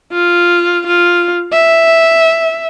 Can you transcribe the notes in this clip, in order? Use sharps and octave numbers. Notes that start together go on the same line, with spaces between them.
F4
F4
E5